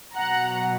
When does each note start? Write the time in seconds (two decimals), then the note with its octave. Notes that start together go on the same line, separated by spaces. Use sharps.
0.15 B2 F#3 F#5 A#5